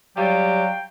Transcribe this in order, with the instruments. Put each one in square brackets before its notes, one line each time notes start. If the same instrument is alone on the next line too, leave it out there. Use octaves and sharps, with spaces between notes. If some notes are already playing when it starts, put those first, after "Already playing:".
[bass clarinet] F#3 [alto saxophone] G3 [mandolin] F4 [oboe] G5